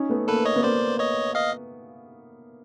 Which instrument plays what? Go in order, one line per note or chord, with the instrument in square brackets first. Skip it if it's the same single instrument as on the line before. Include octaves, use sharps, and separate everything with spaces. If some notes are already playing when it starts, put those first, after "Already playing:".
Already playing: [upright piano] C#4 D#4
A3 B3
[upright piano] A#3 [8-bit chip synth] A4 B4
[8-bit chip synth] C#5 D#5
[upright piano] B3
[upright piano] A#3 [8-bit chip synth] C5 D5
[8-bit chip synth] C#5 D#5
D#5 F5